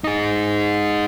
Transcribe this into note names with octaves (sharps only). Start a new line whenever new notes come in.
D#4 G#4